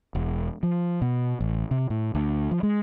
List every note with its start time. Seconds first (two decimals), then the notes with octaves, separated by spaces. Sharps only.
0.15 E1
0.63 F3
1.02 B2
1.41 A1
1.71 C3
1.90 A2
2.15 D2
2.51 F3
2.63 G#3